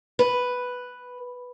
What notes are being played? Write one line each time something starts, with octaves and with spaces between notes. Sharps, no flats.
B4